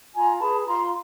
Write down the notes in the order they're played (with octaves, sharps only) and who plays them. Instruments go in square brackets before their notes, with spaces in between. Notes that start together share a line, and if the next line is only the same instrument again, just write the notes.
[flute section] F4 G#5 A#5
G#4 B4 A5 B5
F4 A#5 C6